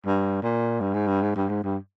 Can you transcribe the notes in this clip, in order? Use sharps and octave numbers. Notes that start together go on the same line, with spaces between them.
G2
A#2
G2
G#2
G2
G#2
G2
G#2
G2